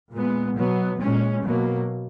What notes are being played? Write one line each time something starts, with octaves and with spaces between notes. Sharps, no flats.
A#2 G#3 B3
B2 F#3 B3
A#2 G#3 C#4
B2 F#3 A#3